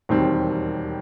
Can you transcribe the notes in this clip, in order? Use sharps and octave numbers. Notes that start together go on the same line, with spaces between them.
E1 D#2 D#3 G3 C4